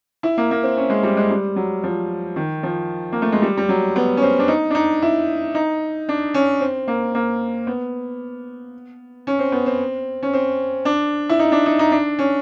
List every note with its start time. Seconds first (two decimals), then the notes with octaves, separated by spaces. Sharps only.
0.23 E4
0.38 A#3
0.51 A#3
0.63 C4
0.77 C#4
0.90 G#3
1.03 G3
1.17 G#3
1.31 G3
1.56 F#3
1.84 F3
2.36 D#3
2.63 F3
3.12 A#3
3.22 A3
3.32 G#3
3.42 G3
3.57 G3
3.69 F#3
3.96 B3
4.17 C#4
4.22 C4
4.39 D4
4.48 D#4
4.70 D4
4.75 D#4
5.02 E4
5.55 D#4
6.09 D4
6.34 C#4
6.60 C4
6.88 A#3
7.15 A#3
7.67 B3
9.27 C#4
9.39 C4
9.52 B3
9.66 C4
10.23 C#4
10.33 C4
10.85 D4
11.29 E4
11.39 D#4
11.52 D4
11.66 D#4
11.79 D#4
11.92 D4
12.19 C#4